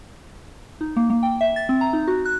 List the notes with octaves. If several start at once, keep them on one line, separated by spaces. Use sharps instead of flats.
D#4
A#3
A#3
G5
E5
A6
C4
A#5
D#4
F#4
F#6